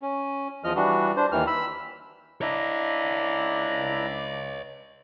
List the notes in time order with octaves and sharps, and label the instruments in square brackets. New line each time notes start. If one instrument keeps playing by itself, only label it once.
[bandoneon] C#4
E2 F3 D#5 F6
E3 G3 D4 F#4
D4 C5
D#2 D#3 E3 F6
B5 E6
[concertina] D4 E4 A#5 [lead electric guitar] C#5 D#5